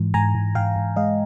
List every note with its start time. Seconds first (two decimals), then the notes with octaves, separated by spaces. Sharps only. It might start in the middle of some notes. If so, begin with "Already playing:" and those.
Already playing: G#2 E3
0.14 G#2 G#5 A#5
0.35 G#2
0.55 G#2 F5 G5
0.76 G#2
0.96 G#3 D#5 F5